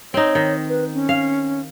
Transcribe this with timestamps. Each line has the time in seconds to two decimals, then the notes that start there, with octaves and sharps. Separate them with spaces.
0.14 C4 D#4 C#5
0.35 D#3
0.69 B4
0.94 C#4
1.09 F5